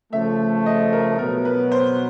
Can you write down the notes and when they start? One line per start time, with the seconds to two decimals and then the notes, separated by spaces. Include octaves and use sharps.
0.13 C#3 F3 A3 E5
0.66 D#5
0.93 A#4
1.19 B2 F#3 B3 A#4
1.45 B4
1.72 C5